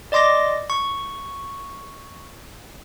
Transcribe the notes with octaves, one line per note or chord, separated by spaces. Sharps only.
D5 D#5 C6 D6 A#6
C#6